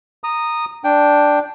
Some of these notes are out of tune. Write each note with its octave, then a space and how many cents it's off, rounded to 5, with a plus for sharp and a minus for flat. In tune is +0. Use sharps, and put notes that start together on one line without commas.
A#5 -5 D#6 -10
D4 +0 G5 +0